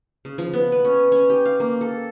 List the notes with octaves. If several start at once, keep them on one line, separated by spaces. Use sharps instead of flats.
C#3
F3
B3
B4
C#4
C#4
G4
F5
A#3
A4